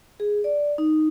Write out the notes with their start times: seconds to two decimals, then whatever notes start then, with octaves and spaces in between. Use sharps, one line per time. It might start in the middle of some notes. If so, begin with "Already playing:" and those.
0.20 G#4
0.44 D5
0.78 D#4